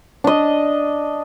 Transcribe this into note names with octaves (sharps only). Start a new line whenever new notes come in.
D4 D#5